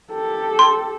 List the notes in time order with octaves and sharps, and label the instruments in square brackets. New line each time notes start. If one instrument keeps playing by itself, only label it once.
[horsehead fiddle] G4 A4
[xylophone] C6